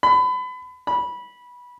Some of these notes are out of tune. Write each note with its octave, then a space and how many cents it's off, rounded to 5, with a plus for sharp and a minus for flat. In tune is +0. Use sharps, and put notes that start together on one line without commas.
B5 +30
B5 -15